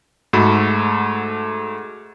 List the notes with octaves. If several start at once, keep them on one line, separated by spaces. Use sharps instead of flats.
G#2 A3 F#4 A4 B5